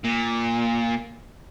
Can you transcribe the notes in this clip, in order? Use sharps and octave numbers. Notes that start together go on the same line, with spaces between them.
A#2